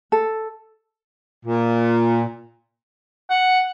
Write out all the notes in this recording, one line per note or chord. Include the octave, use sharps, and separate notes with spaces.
A4
A#2
F#5